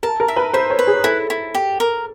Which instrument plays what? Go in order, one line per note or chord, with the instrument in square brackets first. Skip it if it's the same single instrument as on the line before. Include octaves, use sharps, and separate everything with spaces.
[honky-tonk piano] A#4 [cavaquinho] A5
[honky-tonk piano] A#4
[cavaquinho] E5
[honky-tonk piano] B4
[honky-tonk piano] C5 [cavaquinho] E5
[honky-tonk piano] C#5
[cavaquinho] B4
[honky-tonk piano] G#4
[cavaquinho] E4 [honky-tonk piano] A4
[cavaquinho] E4
G4
A#4